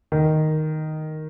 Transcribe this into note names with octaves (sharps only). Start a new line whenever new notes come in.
D#3